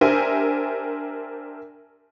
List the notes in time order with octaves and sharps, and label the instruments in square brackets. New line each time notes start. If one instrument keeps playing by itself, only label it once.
[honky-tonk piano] D4 G4 A#4 C5 E5 G#5